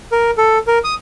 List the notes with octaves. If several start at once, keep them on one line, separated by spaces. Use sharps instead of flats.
A#4
A4
A#4
D#6